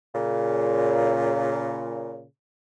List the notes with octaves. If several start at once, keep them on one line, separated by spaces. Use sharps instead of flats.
A#2 C#3